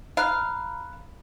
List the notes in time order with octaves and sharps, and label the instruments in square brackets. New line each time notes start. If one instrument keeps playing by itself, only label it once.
[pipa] F5 [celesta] A#5 B5 F#6